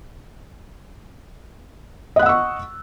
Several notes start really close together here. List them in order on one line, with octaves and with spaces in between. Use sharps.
D#5 F#6 F#5 E6 C#6